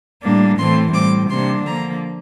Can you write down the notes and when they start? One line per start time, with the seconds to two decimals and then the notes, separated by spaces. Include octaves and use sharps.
0.23 A2 G3 A#3 D4
0.57 A2 E3 A3 C4 C6
0.93 A2 G3 C4 D6
1.30 C3 G3 A#3 D4 C6
1.64 D3 F3 A#3 A#5